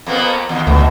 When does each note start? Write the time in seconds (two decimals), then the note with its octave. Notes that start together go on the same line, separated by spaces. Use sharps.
0.06 F2 A#3 B3
0.49 E2 D#3
0.67 D2 B2